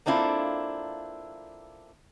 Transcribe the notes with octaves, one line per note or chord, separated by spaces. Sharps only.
A#3 C4 D4 E4 F4 A4